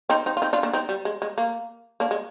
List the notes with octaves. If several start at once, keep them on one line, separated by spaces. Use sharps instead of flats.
C4 D#4
C4 D#4
F4
C4 D#4
D4 F4
A#3 D4
C4 D#4
G3
G#3
G#3
A#3
A#3 D4
G#3